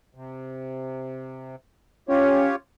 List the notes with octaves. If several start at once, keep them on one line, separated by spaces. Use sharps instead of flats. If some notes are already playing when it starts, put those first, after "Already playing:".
C3
C#4 F4 G4 C#5